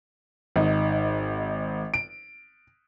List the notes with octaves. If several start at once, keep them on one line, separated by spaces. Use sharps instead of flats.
G#1 D#4
D7